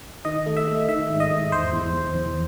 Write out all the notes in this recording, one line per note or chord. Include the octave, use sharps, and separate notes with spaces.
D#3 D#5
A3
E5
A3
D#3 E5
G#2
D#5
G#2
E2 C5
E2
E2
E2